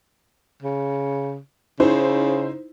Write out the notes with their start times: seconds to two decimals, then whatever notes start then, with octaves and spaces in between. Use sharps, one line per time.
0.62 C#3
1.80 C#3 D#4 E4 C5